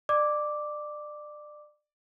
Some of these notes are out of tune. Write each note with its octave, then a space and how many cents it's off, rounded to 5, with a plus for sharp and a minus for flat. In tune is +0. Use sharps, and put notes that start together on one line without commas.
D5 +25 D6 +0